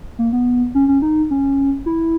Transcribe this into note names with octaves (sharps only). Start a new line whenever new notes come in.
A#3
B3
C#4
C#4
D#4
C#4
E4